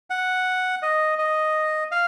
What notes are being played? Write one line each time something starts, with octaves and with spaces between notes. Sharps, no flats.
F#5
D#5
D#5
F5